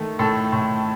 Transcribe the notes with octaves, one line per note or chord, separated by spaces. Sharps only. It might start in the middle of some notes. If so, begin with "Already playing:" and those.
Already playing: D#3 A3
A2 A4
A2